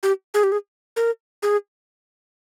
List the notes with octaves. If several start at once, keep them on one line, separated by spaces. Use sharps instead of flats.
G4
G#4
G4
G#4
A#4
G#4